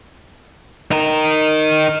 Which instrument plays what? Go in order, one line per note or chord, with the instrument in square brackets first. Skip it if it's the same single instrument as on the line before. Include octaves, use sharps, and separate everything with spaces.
[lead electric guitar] D#4 A#4